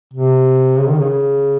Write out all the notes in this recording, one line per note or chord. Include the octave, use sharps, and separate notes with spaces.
C3
C#3
D#3
C#3